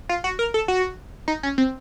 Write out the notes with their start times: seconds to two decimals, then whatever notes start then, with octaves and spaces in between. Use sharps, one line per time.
0.09 F4
0.24 F#4
0.39 A#4
0.54 A4
0.68 F#4
1.28 D#4
1.43 C#4
1.58 C4